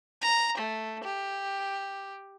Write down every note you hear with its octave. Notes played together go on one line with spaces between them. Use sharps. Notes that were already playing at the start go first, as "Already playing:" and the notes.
A#5
A3
G4